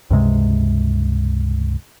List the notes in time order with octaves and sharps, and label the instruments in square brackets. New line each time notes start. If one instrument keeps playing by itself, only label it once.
[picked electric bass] C#2 G2 C3 G#3